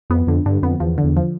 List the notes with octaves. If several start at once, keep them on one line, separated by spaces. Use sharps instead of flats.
F2 B3
F2 D3
G2 D3
F2 B3
E2 F3
D3
E2
F3